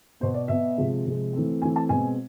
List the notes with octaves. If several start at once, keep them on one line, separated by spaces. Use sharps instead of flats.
B2 B3 C5
D5
B2 B3 E5
C3 F3 G#3
C3 F3 G#3
E3 A3 C4
E3 A3 C4 G#5
A5
B2 G#3 C4 G#5